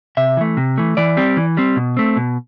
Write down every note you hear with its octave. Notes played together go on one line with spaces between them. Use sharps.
C3 E5
E3 A3
C3
E3 A3
E3 D5
G3 C4
E3
G3 C4
B2
A3 C4
B2